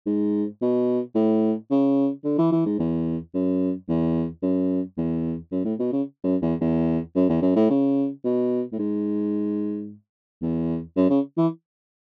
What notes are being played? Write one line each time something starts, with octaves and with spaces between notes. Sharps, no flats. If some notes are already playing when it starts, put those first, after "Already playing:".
G#2
B2
A2
C#3
D3
E3
E3
G#2
E2
F#2
E2
F#2
E2
F#2
A2
B2
C#3
F#2
E2
E2
F#2
E2
F#2
A2
C#3
B2
A2
G#2
E2
F#2
C#3
E3